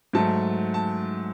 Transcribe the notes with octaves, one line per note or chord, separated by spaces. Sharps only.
G#2 F#3 A3 A5
A5